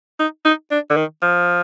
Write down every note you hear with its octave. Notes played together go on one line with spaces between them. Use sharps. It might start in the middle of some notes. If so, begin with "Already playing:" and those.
D#4
D#4
D4
D3
D#3
F3